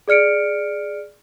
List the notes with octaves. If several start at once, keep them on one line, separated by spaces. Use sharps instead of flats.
G#4 D5 F6 C#7 D7